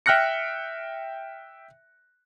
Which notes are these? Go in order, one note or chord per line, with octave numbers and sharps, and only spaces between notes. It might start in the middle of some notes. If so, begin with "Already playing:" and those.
E5 G5 F6 F#6 A#6 C#7